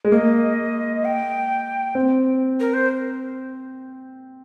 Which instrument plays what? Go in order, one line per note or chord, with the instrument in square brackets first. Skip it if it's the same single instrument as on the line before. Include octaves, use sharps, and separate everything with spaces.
[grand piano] G#3
[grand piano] A#3 [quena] D#5
[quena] G5
[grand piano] C4
[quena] A#4
C5